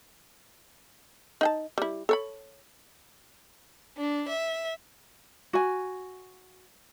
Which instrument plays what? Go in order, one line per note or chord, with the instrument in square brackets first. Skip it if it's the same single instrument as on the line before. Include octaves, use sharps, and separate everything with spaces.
[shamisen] D#4 G5 A5
G3 E4
A4 C#5 B5
[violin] D4
E5
[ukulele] F#4 G#5